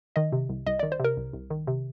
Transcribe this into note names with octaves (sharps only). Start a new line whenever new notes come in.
D#3 D#5
C3
C2
C2 D#5
D#3 D5
C5
C3 A#4
C2
C2
D#3
C3